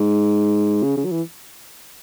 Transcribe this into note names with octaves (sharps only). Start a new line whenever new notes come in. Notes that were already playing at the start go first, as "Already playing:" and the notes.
Already playing: G#2
C#3
C#3
F#3
E3